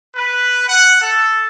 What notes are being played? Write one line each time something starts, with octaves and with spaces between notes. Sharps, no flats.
B4
F#5
A4